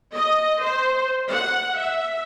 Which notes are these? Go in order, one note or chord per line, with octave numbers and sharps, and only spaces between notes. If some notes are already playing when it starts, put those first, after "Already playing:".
D#5
C5
F#5
E5